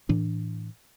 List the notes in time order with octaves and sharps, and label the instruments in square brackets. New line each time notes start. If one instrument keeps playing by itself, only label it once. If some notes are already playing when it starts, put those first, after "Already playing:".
[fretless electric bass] A2 E3 D4